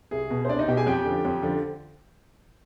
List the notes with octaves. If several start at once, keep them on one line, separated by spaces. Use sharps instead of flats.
C2 G#4
B2
C5
C2 D4 D5
D#4 D#5
B2 G4 G5
G#4 G#5
F2 G4 G5
D3 F3
F2
D3 F3